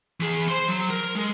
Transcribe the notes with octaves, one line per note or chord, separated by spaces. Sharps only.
E3 G#4
C5 C6
F#3
A#4
G#3